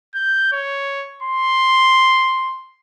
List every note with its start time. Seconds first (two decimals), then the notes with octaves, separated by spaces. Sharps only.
0.15 G6
0.52 C#5
1.23 C6